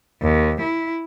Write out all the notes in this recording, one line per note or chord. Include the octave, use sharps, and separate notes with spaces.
D#2
E4